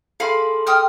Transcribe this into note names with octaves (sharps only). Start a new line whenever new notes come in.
G#4 A4 F5 B5 C6
G5 D#6 F6